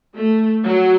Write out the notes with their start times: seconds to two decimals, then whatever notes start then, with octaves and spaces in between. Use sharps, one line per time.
0.15 A3
0.63 F#3